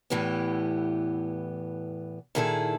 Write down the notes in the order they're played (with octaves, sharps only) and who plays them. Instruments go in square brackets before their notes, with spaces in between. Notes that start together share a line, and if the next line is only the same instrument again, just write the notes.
[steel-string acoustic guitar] E2 A2 E3 A3 B3 G4
A#2 D#3 E4 G#4 A4